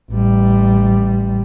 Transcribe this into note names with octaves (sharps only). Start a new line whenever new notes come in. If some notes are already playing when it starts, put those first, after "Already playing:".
A1 G3